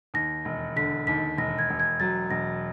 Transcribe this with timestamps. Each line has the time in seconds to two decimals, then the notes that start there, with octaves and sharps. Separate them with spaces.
0.14 D#2 A#6
0.45 E1
0.76 D3 B6
1.07 D#2 B6
1.37 E1 A#6
1.59 G#6
1.70 E1
1.80 G#6
2.00 F#3 A6
2.30 E1 A#6